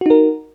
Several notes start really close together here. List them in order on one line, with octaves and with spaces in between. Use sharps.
F#4 D#4 A#4